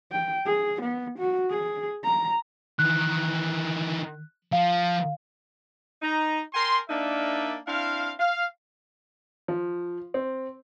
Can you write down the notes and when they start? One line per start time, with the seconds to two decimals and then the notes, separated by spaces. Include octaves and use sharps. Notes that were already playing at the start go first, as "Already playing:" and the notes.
0.12 G5
0.46 G#4
0.82 B3
1.19 F#4
1.51 G#4
2.04 A#5
2.79 D#3 E3 F#6
4.52 F3 F5
6.02 D#4 A#5
6.54 A#4 G5 G#5 C6
6.90 A#3 D4 D#4 A#4 D5 E5
7.68 C4 D4 E4 F5
8.20 F5
9.48 F3
10.14 C4